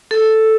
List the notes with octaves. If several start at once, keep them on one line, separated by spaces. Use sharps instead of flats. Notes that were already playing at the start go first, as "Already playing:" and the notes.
A4